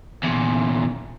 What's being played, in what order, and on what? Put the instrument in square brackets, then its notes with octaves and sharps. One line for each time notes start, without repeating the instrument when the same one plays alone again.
[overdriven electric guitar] E2 A#2